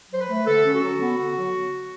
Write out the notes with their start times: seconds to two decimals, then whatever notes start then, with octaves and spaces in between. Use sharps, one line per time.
0.10 F#3 C5
0.20 B4
0.29 A3
0.46 D3 A4
0.64 C#4
0.74 F#4
0.82 F#3
1.00 B3
1.18 D3
1.36 F#3